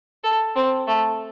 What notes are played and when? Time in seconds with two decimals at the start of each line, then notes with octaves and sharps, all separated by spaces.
0.24 A4
0.56 C4
0.87 A3